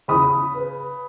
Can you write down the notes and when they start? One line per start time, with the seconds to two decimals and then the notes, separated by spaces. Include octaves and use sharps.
0.08 C#3 B5 D#6
0.55 B4